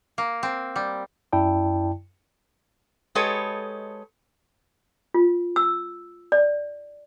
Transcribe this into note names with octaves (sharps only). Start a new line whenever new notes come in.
A#3
C4
G3
F#2 E4 D5 G5 A5
G#3 G4 A4 B4 C#5 D#5
F4
E6
D5